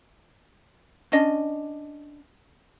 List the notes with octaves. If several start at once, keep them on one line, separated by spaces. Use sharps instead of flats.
C#4 D4 D#5